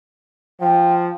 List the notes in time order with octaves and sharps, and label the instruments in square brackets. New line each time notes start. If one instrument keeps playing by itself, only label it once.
[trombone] F3 [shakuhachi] G5